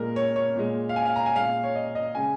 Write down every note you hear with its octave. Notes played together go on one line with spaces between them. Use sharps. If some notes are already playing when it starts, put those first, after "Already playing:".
Already playing: A#2 G#3 A#4
C#5
C#5
A#2 G#3
F5
G#5
F5
A#5
G#5
A#2 G#3 F5
C#5
D#5
D#5
C#3 G#3 G#5